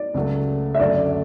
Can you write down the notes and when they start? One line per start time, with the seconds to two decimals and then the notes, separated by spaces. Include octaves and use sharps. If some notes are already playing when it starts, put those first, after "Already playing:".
Already playing: D5
0.14 C#2 C#3 F#3 A3
0.75 E5
0.79 F#2 D3 F#3 A3 D5